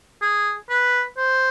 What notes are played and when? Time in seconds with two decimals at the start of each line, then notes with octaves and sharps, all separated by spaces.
0.22 G#4
0.70 B4
1.17 C5